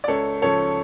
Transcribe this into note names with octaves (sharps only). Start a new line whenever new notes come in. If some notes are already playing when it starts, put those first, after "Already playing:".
D5
C#2 A4 C#5
C#3 F3 A4 C#5